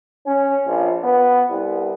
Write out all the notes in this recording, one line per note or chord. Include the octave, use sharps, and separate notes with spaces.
C#4
A#1
B3
C2